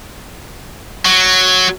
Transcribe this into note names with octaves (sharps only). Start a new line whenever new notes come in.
F#3